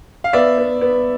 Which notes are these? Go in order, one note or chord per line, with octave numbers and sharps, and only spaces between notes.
F5
B3 D5 E5
B3
B3